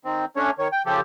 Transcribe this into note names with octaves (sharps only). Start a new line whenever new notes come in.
D#3 C4
A3 C#4 D4 C#5
D#3 C#5
G5
C#3 F3 G4 A4